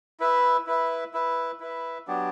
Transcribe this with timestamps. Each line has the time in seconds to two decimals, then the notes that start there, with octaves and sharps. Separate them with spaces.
0.20 E4 B4 E5
0.67 E4 B4 E5
1.13 E4 B4 E5
1.60 E4 B4 E5
2.07 F#3 B3 D4 G4